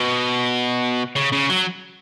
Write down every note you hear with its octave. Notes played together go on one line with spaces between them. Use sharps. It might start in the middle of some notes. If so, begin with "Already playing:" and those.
Already playing: B2
C#3
C#3
F#3